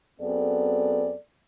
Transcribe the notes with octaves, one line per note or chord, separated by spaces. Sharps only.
F#2 B3 C4 G#4 A4 D5